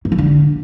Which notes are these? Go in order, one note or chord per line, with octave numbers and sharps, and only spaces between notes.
G#2
E3
D3